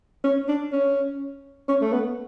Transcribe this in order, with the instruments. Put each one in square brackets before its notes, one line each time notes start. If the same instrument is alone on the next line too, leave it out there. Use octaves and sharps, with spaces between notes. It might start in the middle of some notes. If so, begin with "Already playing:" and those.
[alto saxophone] C#4
D4
C#4
C#4
A3
B3